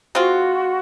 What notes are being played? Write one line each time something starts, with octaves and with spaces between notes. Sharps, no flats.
G#3 C4 F4 F#4